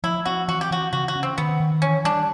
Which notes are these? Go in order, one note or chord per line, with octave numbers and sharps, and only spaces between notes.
F3 E4
C4 F#4
E3 F#4
G4
E3 F#4
C#3 F#4
F#4
C#4
C4
D#3 B3
D#3
E3 C#4
G3 D4